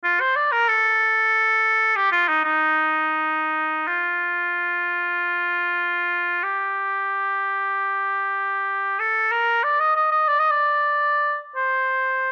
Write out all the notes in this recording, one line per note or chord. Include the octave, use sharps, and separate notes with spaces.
F4
C5
D5
A#4
A4
G4
F4
D#4
D#4
F4
G4
A4
A#4
D5
D#5
D#5
D#5
D5
D#5
D5
C5